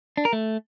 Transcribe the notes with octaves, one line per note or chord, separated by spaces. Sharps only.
D4
A#4
A3